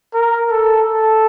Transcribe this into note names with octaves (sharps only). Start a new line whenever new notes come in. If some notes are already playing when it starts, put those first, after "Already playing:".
A#4
A4
A4